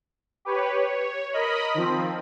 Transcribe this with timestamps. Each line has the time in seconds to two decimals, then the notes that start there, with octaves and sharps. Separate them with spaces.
0.45 G4 B4 C#5
0.77 C#5
1.33 A#4 D#5 B5
1.75 D#3 F3 C4